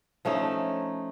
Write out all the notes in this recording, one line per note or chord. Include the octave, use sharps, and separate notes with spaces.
F3 A3 C#4 D#4